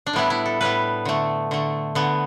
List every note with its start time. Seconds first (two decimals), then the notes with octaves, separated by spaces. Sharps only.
0.06 D4
0.13 A2 G3 B3 E4
0.30 E4
0.46 A4
0.60 A2 G3 B3 B4
1.05 D3 A3
1.51 D3 A3
1.95 D3 B3